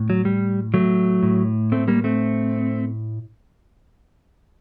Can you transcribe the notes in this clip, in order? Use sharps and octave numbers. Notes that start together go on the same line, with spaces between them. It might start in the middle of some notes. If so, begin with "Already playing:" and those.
Already playing: A2
F#3
G3
F#3 A3
A2
A3 C4
G3 A#3
A3 C4